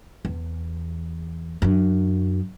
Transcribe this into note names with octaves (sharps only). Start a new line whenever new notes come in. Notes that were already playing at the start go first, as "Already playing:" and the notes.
E2
F#2 D4